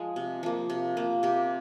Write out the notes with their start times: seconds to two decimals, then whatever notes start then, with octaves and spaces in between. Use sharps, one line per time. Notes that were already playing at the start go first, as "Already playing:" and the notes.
Already playing: F3 G#3
0.16 C3
0.43 F3 A#3
0.70 C3
0.97 F3 A#3
1.23 C3 G4